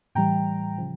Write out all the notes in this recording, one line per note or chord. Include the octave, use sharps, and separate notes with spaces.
A2 E3 G3 G5 A#5
C#3 F3